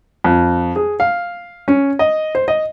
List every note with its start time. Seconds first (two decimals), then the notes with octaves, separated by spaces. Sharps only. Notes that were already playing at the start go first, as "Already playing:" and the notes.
0.24 F2
0.76 G#4
1.00 F5
1.68 C#4
1.99 D#5
2.35 C5
2.48 D#5